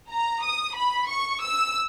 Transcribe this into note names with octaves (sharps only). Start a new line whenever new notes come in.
A#5
D#6
B5
C#6
E6